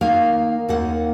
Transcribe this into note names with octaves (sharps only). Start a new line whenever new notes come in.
D#3 A#3 D#4 F5
D#2 D#3 A#3 D#4 F#5